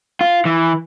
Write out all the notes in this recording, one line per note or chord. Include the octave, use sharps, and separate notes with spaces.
F4
E3